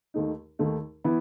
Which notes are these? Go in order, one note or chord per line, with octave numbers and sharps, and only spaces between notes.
D#2 D#3 A3 D#4
D#2 D#3 A3 D#4
E3 B3 E4